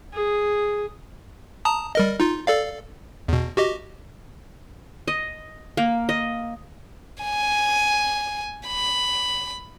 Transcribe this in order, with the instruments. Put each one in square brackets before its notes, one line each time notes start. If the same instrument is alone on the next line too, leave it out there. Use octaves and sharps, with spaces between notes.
[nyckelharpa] G#4
[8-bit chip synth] A5 A#5 D#6
G3 A#4 D#5
D#4 F4
A4 D5 F5
E2 B2
F#4 G4 D#5
[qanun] D#5
A#3
D#5
[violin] G#5
B5